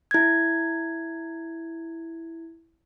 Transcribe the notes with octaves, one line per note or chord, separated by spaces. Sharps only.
E4 G#6